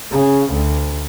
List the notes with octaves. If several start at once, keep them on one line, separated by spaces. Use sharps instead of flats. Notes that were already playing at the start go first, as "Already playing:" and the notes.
C#3
D2